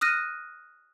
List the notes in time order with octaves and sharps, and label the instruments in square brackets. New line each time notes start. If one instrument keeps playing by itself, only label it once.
[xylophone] D#6 F6 F#6 A#6 D#7